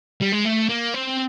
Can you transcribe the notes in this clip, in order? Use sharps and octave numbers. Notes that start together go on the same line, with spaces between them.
G3
G#3
A3
A#3
C4